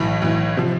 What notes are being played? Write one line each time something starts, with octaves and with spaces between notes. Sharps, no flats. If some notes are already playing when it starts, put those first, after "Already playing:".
Already playing: B1 A2 E3
B1 A2 E3
C3 F3